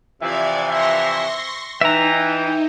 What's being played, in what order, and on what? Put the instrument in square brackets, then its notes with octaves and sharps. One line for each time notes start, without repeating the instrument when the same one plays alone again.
[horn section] C3 E3 F3 [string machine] D5 G#6 [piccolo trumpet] E5
[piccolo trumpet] E5 [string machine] C6 C#6 A#6
[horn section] E3 [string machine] D#4 [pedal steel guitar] E5 A#5 [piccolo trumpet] G5